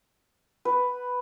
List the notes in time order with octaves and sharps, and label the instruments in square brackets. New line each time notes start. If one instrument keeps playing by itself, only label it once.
[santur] B4